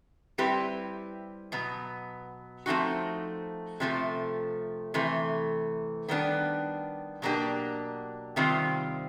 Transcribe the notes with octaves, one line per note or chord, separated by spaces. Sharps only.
G3 C4 E4 G4 B4
B2 F#3 B3
F3 A3 C4 D#4 F#4
C3 F3 A3
C3 E3 A3
D#3 G3 B3 D4
B2 F#3 A#3 D4 G4
C3 D#3 G3 C4 F4